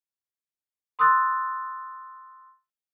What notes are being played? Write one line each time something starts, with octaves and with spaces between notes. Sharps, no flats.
C6 D#6 E6 F#6 A6